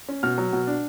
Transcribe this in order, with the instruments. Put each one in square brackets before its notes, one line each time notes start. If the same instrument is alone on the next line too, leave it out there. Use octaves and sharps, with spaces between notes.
[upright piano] C#4
B2 F6
F#3
B2
D4